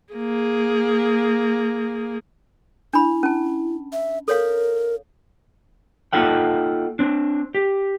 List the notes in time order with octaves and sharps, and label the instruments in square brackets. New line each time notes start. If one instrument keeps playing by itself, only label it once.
[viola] A#3 G#4
[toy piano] D4 B5 [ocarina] E4
[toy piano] C#4 A5
[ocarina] E5
[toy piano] A4 C#5 F5 [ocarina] A#4
[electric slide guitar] A#3 D#4 F4 A4 F#5 G5
C4 D4
G4